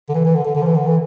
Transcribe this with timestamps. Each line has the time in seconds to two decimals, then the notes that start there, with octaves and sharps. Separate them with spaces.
0.09 D3
0.14 E3
0.25 E3
0.35 D3
0.45 D3
0.55 D3
0.62 F3
0.66 E3
0.76 D3
0.87 E3